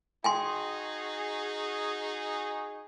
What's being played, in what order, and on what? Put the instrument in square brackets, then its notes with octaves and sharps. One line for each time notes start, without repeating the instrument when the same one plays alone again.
[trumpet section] D#4 F#4 G#4 [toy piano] G5 G#5 C6